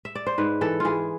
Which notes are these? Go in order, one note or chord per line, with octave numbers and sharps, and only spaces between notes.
E5
D5
C5
G#2 B4
E3 A4
E3 F4 G#4